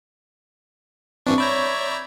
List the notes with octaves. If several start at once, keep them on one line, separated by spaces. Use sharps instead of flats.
G2 E3 C4 D4 C#6
C#5 D5 E5 A#5 B5 G6 G#6